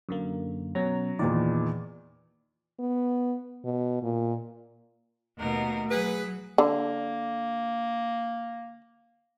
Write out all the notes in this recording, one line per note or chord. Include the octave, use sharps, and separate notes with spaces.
F#2 D3 A#3
B2 F#3 C#4 A#5
E2 A#2 D#3 D5
B3
B2
A#2
D#2 B2 A3 A#4
F#3 G#4 B4
D3 A#3